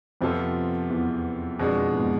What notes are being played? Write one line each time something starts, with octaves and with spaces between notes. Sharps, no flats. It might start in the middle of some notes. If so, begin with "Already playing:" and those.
F2 C3 F3 B3 F4 A4
E2
F2 B2 G#3 D4
E2 G#2